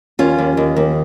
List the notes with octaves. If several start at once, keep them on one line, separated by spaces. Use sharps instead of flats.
D#2 C#4 F4
D#2
D#2
D#2